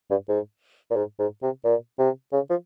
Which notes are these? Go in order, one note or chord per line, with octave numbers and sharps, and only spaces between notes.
G2
G#2
A#2
G#2
G#2
C3
A#2
C3
C#3
F3